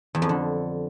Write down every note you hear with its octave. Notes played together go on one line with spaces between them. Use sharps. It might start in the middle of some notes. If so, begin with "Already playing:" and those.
E2
F2
D3